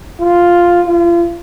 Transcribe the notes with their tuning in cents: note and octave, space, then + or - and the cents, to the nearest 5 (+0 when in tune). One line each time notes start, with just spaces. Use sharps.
F4 +0
F4 -35